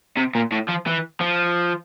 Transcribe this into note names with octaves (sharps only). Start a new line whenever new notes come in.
C3
A#2
A2
F3
E3
F3